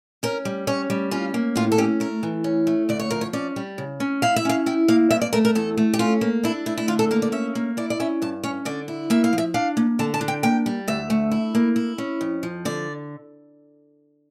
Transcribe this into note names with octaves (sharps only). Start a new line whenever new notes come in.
C#4 A#4
G3
C#4 C#5
G3
C#4 F4
A#3
A2 F4
A4
C#4 G4
A3 A#4
E3
C#4
A3
D2 D5
C#5
F3 A#4
C#5
C#4 D5
G3
C#3
C#4
E4 F5
E5
C#4 F5
E4 G5
A#3 F5
G2 E5
D5
A3 A#4
A#4
E2 A4
A3
G4
C#4 F4
A#3
D4 E4
A3 E4
E4
D3 F4
A4
A#3 A#4
D5
C#4 E5
A#3
E4 D5
D5
C#4 E5
G2 A5
C#4 C#5
D3 D5
E4
A#3 E5
F5
F3
E5
D4 F5
A#3
D3 A5
A5
D4
G5
A#3 G5
G3
D2 E5
A3
E4
A#3
E4
C#4
F2
F3
D3 D5